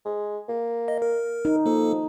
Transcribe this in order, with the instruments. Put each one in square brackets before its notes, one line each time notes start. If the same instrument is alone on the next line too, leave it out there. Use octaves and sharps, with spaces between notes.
[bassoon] G#3
A#3
[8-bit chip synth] D#5
A#4
[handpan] D#4
[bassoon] F3 [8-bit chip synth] A#3 A4